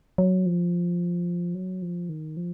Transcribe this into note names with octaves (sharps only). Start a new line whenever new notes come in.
F#3
F3
F#3
F3
D#3
F3